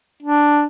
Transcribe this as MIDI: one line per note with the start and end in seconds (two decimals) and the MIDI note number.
0.22 0.65 62